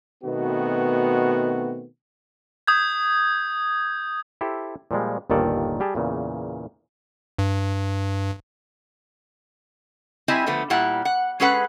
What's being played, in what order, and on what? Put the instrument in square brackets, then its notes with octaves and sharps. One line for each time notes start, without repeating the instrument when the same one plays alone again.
[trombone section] B2 D#3 A3 B3 C4 F#4
[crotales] D#6 G6 G#6
[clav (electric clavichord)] E4 G4 A4 C5
A#2 F3 G3 G#3
G1 D#2 A#2 D#3 A4 D5
G3 G4 G#4 A5
E2 A#2 C#3
[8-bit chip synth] G2
[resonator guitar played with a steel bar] G3 C4 E4 D#5 E5 G#5
D3 F3 A3 B3
A#2 G3 E4 F#5
F#5
G#3 C#4 G#4 A4 B4 F#5